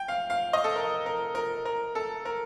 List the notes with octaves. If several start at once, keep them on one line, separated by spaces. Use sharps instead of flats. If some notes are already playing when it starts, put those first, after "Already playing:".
Already playing: G5
F5
F5
D#5
A4
A#4
A#4
A#4
A#4
A4
A#4